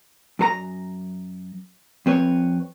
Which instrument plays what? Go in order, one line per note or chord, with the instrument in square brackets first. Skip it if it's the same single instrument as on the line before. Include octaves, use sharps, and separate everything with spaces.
[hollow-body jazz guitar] F#2 A4 A#5
F2 C4 B4 C#5